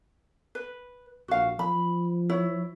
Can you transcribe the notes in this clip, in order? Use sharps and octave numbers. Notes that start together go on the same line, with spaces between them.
B4
A#1 F#4 F5
F3 B5
E4 C#5